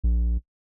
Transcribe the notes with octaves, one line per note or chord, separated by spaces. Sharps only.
A#1